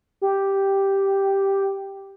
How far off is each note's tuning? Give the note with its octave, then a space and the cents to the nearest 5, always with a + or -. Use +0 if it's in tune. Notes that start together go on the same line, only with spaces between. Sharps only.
G4 +0